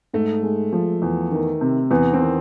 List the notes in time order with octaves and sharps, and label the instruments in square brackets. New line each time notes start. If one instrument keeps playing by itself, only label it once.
[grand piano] G#2 [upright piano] A3
[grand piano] G#3
F3
E2
D#3
C3
[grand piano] E2 [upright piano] B3
[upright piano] C4
[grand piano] D#3